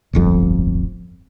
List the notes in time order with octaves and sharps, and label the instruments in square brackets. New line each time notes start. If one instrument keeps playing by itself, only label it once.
[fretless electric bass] D1 G1 F2